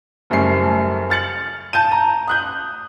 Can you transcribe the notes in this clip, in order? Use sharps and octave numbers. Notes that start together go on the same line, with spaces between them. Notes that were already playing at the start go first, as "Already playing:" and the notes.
F#1 F#2 G3 A3 C7
F6 A6 C#7 F#7
A5 G6 D#7
A#5
D#6 F#6 G6